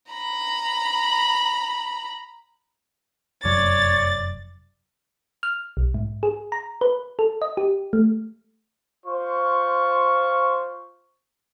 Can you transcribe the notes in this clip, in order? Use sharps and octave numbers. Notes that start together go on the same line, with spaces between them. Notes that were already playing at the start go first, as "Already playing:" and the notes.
A#5 B5
F1 F#2 F#3 C#5 D5 A6
F6
B1
G#2
G#4
A#5
B4
A4
D#5
G4
A3
F4 C5 C#6